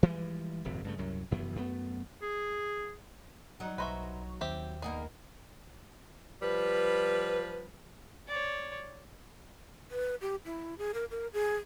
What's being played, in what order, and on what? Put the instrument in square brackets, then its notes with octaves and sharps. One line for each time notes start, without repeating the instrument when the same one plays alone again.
[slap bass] E3 F3 G3 G#3
D#1 G#1 F2 C3
G2 C#3 A3
C2 F#2 F#3
F1 F#2 E3 B3
F#2 A3 B3
[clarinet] G#4
[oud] F#3 D#4
[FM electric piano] B1 A#5 C#6 [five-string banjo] B4 C5 E5
[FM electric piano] D#2 [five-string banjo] C4 G4 E5
[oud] A#3 B3 D#4 [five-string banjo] G#4
[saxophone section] F3 G3 B4
[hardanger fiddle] C#5 D5
[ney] B4
G4
E4
G#4
A#4
A#4
G#4